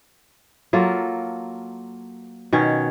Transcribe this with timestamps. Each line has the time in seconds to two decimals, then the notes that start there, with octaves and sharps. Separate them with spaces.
0.73 F#3 A#3 F4 A4
2.53 B2 D#3 C#4 C#5